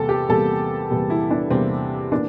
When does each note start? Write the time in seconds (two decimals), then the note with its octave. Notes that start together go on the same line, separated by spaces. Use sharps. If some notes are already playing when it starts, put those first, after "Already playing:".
Already playing: E2 C3 G3 A#3 A4
0.09 G4
0.29 E2 C3 G3 A#3 A4
0.90 E2 C3 G3 A#3
1.10 E4
1.31 D4
1.50 E2 C3 G3 A#3 C4
2.12 E3 A#3 D4